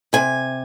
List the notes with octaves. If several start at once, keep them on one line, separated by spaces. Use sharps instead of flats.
C3 G#5